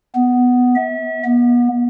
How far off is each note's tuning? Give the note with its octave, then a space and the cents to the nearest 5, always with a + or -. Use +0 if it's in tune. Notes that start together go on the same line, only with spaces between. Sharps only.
B3 +5
E5 -35
B3 -35